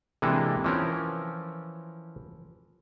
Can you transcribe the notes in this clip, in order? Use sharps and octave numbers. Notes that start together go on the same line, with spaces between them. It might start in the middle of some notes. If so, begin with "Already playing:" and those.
C3 E3 G#3 A#3 D4 A4
E3 F3 C#4 A#4